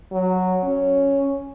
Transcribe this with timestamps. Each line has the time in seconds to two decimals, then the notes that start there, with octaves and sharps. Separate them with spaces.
0.12 F#3
0.63 C#4